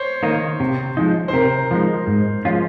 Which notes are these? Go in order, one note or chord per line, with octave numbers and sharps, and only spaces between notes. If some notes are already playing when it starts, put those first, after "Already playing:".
Already playing: C5 C#5
D#3 A#3 D#4
C3
F3 G#3 D#4
C5
C3 A#4
F3 G#3 D#4
G#2
F3 G#3 C#4 F4